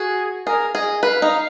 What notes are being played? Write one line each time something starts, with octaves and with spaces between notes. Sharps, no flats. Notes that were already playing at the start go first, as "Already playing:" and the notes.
Already playing: F#4 G#4
G#4 A#4
G#4 D#5
B4 F5
D#4